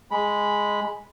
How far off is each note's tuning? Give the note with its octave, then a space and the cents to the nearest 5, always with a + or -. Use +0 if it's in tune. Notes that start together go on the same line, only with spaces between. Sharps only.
G#3 +0 B5 -5